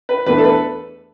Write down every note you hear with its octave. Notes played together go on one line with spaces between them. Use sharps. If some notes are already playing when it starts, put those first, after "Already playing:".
B4
E2 E3 A3 D4 B4
A4
B4